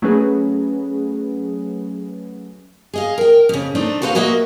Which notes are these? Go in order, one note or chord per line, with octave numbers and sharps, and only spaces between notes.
F#3 A3 C#4 G#4 B4
G#4 D#5 F5
A#4 G5
F2 C#3
A3 C4 D4 D#4
F#4 A4 B4 C5 D#5 F5
A#2 A#3 F#4 B4 D#5 E5